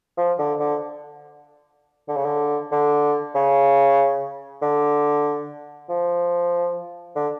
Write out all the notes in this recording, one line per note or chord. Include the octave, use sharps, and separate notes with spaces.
F3
D3
D3
D3
C#3
D3
D3
C#3
D3
F3
D3